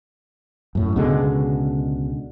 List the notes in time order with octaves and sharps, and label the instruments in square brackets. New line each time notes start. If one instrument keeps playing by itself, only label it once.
[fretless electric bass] F#2 A2
C#2 B2 D3 G#3